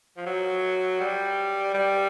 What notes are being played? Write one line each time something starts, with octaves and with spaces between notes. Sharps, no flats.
F3
F#3
G3
G3